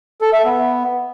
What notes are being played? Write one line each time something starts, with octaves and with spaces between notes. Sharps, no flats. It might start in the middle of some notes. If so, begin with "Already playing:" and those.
A4
E5
B3